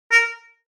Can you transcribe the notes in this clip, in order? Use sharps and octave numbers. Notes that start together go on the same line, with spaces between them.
A#4